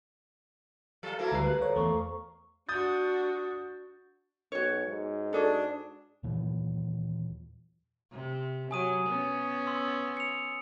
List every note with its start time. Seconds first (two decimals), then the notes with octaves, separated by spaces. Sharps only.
1.03 F#3 F4 A4
1.19 A3 A#3 E4 F#4 A4 C5
1.32 D2 G3 G#3 F#4 G4 B4 C7
1.47 A#2 F#6
1.62 A4 C5 C#5
1.76 E2 A3 C#6
2.69 D4 F#4 D#6 G6 A6
4.52 B1 F#4 C#5
4.86 G#2
5.33 D4 F#4 G#4 A4
6.23 D#2 A#2 E3 F#3
8.11 C3
8.71 F#3 G#5 D#6 D#7
9.07 B3 C#4
9.67 C6 E6
10.17 C#7 F7